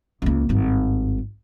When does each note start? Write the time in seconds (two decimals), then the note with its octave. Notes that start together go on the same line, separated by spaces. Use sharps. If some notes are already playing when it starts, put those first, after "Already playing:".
0.22 C#2 A#3
0.49 G#1 G2